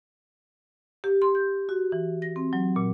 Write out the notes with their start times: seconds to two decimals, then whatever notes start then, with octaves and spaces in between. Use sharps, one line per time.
1.04 G4
1.22 C6
1.35 G6
1.69 F#4
1.92 E3
2.22 A#6
2.36 C4
2.53 F#3
2.76 A#2